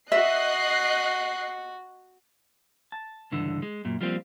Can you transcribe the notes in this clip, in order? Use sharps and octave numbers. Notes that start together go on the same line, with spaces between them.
F#4 D#5 E5 F#6 C7
A5
C#2 G2 D3 E3
G#3
F#2 A#2
F3 G3 A#3 C4 F4